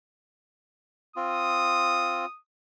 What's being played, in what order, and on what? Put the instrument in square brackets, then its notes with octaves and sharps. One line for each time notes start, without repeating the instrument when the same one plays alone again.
[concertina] C4 F4 [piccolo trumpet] D#6